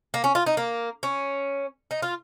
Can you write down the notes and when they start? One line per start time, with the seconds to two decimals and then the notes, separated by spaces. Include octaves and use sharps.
0.14 A#3
0.24 C#4
0.35 F4
0.46 D#4
0.57 A#3
1.03 C#4
1.91 D#4
2.02 F4